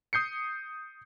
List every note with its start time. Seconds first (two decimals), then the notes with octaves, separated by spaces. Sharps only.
0.13 D#6 G6 C7 C#7